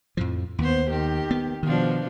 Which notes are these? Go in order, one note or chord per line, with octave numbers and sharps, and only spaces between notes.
F2 A2 F3
D#2 B3 C5
D#3 G4
B3
B2 D#3 F3 D4